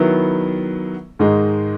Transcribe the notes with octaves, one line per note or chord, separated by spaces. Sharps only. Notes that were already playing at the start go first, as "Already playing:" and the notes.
Already playing: D#3 F#3 B3 E4
G#2 D#3 G#3 D#4 G#4